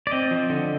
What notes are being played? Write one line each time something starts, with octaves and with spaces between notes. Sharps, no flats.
D5
C4 D#5
F3
D3